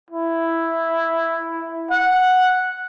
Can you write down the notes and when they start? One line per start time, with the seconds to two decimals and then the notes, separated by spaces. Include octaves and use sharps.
0.10 E4
1.91 F#5